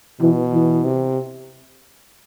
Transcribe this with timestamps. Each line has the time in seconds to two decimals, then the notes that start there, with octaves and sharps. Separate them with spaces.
0.21 B2 E3
0.53 E3
0.85 C3